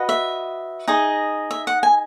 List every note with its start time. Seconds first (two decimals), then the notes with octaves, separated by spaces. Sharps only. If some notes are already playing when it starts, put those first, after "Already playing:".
Already playing: F#4 B4 D#5
0.09 E5
0.88 D#4 G#4 D#5
1.51 E5
1.67 F#5
1.83 G#5